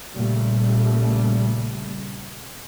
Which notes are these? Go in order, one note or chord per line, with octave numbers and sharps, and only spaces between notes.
A#1 A#2 C#3 G3 A3